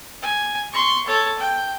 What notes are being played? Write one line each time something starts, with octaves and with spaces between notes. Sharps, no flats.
G#5
C6 C#6
A4 C#5
G5